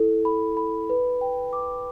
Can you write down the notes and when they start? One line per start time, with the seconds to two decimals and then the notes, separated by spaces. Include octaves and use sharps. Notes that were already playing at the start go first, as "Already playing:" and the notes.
Already playing: E4 A4
0.25 B5
0.57 B5
0.90 B4
1.21 G5
1.53 D6